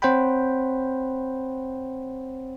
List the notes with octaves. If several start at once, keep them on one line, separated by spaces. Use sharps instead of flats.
C4 C5 C#5 F#5 G5 B5